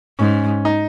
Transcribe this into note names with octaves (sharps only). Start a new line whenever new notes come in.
G#2 C#4
D#4